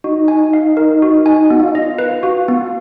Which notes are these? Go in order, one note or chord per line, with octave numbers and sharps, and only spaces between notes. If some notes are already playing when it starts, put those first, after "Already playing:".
D#4 F#4
G#5
F5
A#4
F#4
G#5
B3 F#4
F4
D#4
F4 D#5
B4
F#4
B3